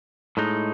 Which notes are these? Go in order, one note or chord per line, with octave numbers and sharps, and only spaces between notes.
A2 G#3 D#4